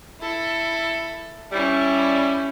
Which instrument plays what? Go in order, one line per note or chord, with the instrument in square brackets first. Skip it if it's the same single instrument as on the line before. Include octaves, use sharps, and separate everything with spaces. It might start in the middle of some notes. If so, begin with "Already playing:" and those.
[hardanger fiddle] E4 A4
[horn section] G3 [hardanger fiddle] C#4 E4